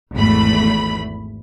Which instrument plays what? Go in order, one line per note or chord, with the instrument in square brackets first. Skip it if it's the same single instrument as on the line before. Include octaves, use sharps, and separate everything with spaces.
[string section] G#1 E2 A3 B5